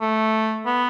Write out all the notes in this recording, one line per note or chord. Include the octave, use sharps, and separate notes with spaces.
A3
B3